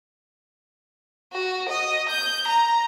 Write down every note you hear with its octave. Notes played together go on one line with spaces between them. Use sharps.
F#4
D#5
G6
A#5